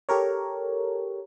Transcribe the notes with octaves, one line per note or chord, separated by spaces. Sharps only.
G4 A4 A#4 C#5